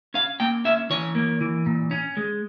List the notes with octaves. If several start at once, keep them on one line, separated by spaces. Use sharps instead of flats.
C#4 F5
A#3 G5
C#4 E5
E3 C#5
A#3
E3
A#2
C#4
G#3